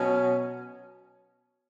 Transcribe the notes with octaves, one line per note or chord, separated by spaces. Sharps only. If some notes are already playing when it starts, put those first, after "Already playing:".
Already playing: B2 F#3 C#4